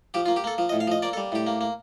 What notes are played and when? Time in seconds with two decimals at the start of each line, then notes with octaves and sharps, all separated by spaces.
0.14 F3 G4
0.26 F4
0.28 A#3
0.36 G4
0.44 A#3 A4
0.58 F3
0.69 D#5
0.72 A2
0.80 F5
0.87 F3 D#5
1.02 A#3 D5
1.13 A4
1.17 G3
1.32 A2 G4
1.47 A#3
1.61 A#3